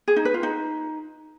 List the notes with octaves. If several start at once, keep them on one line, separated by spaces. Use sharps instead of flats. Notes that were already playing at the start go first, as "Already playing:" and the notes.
G#4
D#4
B4
F4
D#4